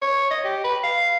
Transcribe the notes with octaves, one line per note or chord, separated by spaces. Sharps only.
C#5
D#5
G4
B4
F5